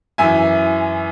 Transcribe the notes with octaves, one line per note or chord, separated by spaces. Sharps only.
F#2 E3 E5 G#5